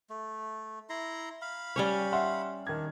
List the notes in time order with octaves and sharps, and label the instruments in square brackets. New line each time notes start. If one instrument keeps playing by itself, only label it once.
[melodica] A3
E4 A#5 C6
F5 B5
[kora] G3 C#4 C#5
[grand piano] E5 F#5 C6
[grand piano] D#3 G#6 [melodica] D4